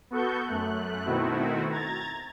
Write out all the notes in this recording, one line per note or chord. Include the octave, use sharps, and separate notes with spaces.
B3 F#4 A4 C#6 G6
F#2 A3 F#6
B2 D#3 A3 C4 E4 F#4
A#5 G#6 A6